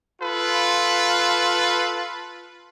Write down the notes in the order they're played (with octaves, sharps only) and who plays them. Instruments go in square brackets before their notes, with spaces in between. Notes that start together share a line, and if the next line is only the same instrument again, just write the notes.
[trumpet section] F4 A4 B4